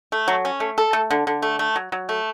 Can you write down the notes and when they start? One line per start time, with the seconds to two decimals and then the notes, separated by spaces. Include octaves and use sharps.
0.12 A3
0.28 F#3
0.45 C#4
0.60 A3
0.78 A4
0.93 A3
1.11 D3
1.27 D3
1.42 A3
1.59 A3
1.76 F#3
1.92 F#3
2.09 A3